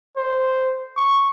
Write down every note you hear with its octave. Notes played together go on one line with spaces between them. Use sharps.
C5
C#6